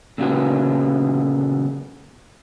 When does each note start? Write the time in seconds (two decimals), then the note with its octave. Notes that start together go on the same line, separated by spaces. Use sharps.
0.18 A#2 C#3 F#3 B3